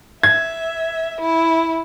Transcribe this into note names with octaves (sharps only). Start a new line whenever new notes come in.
E5 G#6
E4